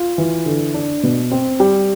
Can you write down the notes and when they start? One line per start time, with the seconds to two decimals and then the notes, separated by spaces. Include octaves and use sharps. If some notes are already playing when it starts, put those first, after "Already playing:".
Already playing: F4
0.18 E3
0.46 D3
0.74 D4
1.03 B2
1.32 C4
1.60 G3